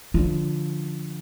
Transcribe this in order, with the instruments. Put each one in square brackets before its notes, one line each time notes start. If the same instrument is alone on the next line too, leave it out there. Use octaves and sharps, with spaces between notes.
[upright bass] D3 [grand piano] F3 D4 F4